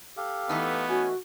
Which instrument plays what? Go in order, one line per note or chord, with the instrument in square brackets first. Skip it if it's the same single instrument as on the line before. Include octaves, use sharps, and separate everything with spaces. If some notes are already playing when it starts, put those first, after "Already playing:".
[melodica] G4 A4 F5
[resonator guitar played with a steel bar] E3 A3 D#4 [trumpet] B3
[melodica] C#4 G#5 [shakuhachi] F#4